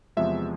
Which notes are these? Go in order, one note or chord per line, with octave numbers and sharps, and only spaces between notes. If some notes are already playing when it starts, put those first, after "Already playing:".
E2 C3 F3 G#3 E5